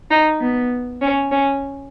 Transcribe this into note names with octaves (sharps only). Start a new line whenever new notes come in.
D#4
B3
C#4
C#4